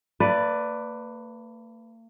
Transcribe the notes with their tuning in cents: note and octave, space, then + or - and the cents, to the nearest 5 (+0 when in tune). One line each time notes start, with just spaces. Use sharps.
A#3 -45 B4 +10 D5 +0